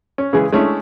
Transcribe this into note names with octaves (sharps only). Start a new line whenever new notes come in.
C#4
C#3 E3 G#3 G#4
G#3 A3 C#4 D4 E4